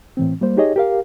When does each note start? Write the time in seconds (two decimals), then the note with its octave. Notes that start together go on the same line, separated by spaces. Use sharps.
0.17 A2 E3 C4
0.41 G3 A#3 C5
0.57 D#4 G4 G#4 C#5 D#5
0.76 G4 A#4 F5